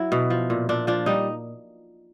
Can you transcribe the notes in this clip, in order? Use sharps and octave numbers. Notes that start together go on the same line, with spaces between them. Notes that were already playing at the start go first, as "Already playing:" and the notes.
Already playing: F#3 E4
B2
F3
A#2
A#2 D4
F3 D4
G3 D#4